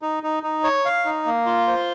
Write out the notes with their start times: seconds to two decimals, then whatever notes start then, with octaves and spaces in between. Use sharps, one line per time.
0.02 D#4
0.23 D#4
0.43 D#4
0.64 C#5
0.85 F5
1.05 D#4
1.26 A#3
1.46 F4
1.67 C5